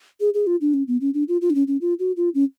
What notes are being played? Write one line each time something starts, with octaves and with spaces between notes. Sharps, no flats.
G#4
G#4
F4
D4
C#4
B3
C#4
D4
F4
F4
D4
C#4
C#4
F4
F#4
F4
C#4